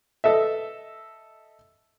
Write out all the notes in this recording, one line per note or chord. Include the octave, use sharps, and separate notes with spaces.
A4 D#5 E5